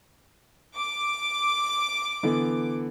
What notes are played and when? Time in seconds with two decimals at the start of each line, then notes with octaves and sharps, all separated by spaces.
0.78 D6
2.23 D3 E3 B3